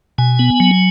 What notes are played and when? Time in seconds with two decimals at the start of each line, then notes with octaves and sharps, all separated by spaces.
0.18 B2 G#5
0.39 B3
0.60 F#3